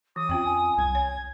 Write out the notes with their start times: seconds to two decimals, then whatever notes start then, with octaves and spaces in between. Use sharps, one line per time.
0.16 E3 D6 D#6
0.29 F2 C4 C#4 F4 G5
0.45 G#5
0.78 C2 G#6
0.95 C#5